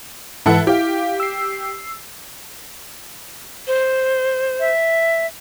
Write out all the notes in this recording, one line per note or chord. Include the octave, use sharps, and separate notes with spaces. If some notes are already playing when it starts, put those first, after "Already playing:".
G#2 E3 E4 A4 B4 F#5
E4 G4 F5
E6 C7
C5
E5